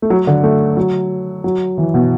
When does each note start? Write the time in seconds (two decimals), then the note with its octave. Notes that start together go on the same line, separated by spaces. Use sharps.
0.02 A3
0.10 F#3
0.27 D3
0.43 A3
0.77 F#3
1.44 F#3
1.78 E3
1.94 B2